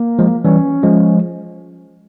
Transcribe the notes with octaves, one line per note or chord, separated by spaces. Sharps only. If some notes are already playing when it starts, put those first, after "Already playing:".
Already playing: A#3
F3 G#3
E3 G3 C#4
F3 G#3